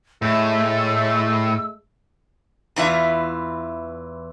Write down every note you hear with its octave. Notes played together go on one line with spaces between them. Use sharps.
A2 G#3 A3 E6
E2 E3 F4 E5